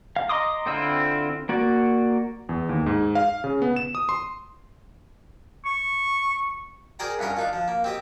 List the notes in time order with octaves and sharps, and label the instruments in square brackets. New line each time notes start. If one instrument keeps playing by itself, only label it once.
[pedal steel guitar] F5
D#5 A#5 C6 D6 D#6
D3 C4 E4 F4 E6
A#3 F#4 D5
[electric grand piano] E2
D#2
G#2
F5
C#3
B3
E7
D#6
C6
[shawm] C#6
[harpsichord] G#4 A#4 C5 D5 G5 A#5
C2 G2 C#4 A#4 A#5
D4 D#4 F4
F3
A#3
C4 G4 D#5